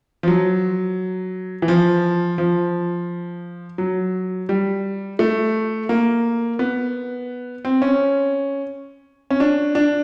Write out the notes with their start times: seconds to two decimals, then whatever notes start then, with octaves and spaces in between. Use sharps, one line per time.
0.23 F3
0.28 F#3
1.62 E3
1.68 F3
2.38 F3
3.78 F#3
4.49 G3
5.19 A3
5.89 A#3
6.59 B3
7.65 C4
7.82 C#4
9.30 C#4
9.40 D4
9.75 D4